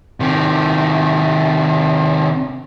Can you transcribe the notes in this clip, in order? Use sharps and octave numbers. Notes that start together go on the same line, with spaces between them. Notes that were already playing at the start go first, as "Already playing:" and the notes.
C3 D#3